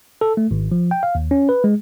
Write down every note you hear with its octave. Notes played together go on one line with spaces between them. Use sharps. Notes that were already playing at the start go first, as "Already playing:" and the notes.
A4
A3
G#1
F3
G5
F5
D#2
C#4
B4
G#3